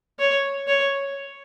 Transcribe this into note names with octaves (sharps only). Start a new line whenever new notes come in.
C#5
C#5